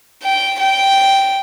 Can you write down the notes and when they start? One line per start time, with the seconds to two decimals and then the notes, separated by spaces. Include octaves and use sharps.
0.23 G5
0.60 G5